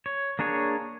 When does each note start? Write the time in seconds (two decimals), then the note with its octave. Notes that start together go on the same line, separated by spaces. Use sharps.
0.06 C#5
0.39 A#3 D4 G#4 C#5